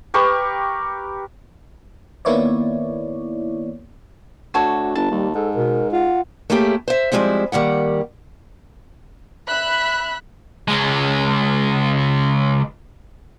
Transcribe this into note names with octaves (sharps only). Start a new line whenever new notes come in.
G4 A#4 B4 C#6
D#3 A#3 B3 E4 C#5 D5
D2 F#4 A4 C#5
G1 A5
D#2 G3
G#2 A4
B2 A#4
F4 F#5
A3 A#3 C#4 E4 G4 G#4
C5 E5
F3 G3 G#3 C4 E4
D#3 G3 A#3 F#5
E5 B5 F#6
C#2 G#3